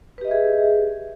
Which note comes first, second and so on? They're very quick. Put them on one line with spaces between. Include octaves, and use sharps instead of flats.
B4 G4 D#5 E5 G#4